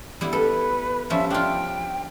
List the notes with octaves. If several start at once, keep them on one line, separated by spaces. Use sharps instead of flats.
G3 B3 E4
A4 B4
F3 G3 C#4 E5
D4 F4 G5